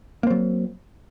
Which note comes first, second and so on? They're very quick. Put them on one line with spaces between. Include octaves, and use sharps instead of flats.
A#3 C4 F#3